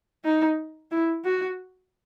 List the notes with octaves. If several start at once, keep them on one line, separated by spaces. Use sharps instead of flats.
D#4
E4
F#4